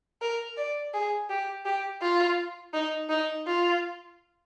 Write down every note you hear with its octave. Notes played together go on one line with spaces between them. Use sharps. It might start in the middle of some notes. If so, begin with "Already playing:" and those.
A#4
D5
G#4
G4
G4
F4
D#4
D#4
F4